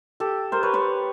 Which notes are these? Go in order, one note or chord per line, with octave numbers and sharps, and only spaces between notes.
G4 A4
A#4 C5
B4 C#5
B4 C#5